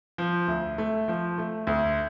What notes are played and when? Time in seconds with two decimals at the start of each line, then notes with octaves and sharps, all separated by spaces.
0.18 F3
0.47 D2
0.78 A3
1.08 F3
1.38 A3
1.67 D2